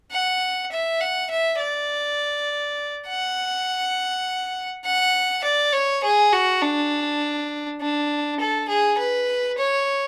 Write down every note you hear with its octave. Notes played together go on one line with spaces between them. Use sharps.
F#5
E5
F#5
E5
D5
F#5
F#5
D5
C#5
G#4
F#4
D4
D4
A4
G#4
B4
C#5